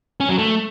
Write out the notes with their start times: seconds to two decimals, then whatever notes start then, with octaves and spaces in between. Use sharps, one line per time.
0.20 C#4
0.29 F#3
0.38 A3